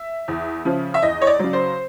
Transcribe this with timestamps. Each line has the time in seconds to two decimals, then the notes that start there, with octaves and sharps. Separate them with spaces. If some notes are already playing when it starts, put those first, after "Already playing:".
Already playing: E5
0.28 E2
0.65 C#3 F3
0.94 E5
1.02 E2 D#5
1.22 C#5
1.27 D5
1.39 C#3 F#3
1.53 C5